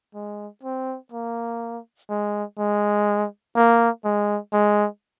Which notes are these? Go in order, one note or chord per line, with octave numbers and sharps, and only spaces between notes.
G#3
C4
A#3
G#3
G#3
A#3
G#3
G#3